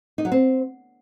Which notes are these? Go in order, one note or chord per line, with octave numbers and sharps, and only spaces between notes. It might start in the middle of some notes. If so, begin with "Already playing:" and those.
D#4
F#3
C4